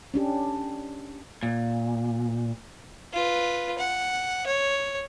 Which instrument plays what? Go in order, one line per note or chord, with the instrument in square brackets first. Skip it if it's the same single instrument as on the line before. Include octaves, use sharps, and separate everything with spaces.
[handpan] C#4 D4 G4
[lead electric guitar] A#2
[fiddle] F4 B4
F#5
C#5